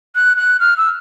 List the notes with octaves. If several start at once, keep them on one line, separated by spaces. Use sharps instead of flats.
F#6
F#6
F6
E6